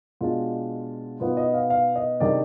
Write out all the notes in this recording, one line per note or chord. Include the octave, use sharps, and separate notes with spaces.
B2 G#3 D4 F4
B2 B3 D#4 F4
D#5
F5
F5
D#5
C3 D#3 G#3 D4 D5